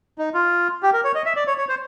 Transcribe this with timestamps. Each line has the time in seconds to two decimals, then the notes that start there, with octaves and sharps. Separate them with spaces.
0.18 D#4
0.34 F4
0.83 G4
0.93 A#4
1.04 C#5
1.15 D#5
1.26 E5
1.36 D5
1.47 C#5
1.58 C#5
1.69 C5